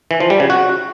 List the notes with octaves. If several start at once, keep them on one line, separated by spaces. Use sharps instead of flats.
E3
F3
G3
C#3
F#4